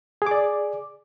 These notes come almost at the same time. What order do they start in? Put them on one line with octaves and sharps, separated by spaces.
G#4 D6 D5